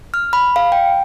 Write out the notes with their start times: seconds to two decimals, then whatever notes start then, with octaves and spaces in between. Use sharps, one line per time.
0.14 F6
0.33 B5
0.56 F5
0.72 G5